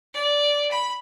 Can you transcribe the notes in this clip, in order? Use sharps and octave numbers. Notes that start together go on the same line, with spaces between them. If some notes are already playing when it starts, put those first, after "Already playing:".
D5
B5